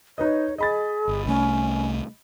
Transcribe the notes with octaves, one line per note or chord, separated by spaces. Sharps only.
D#4 B4 C#5 D#5
G#4 D#5 B5 A6
G1
C2 A3 C#4